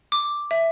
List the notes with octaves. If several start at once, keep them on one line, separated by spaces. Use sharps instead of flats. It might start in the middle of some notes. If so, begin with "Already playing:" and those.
D6
E5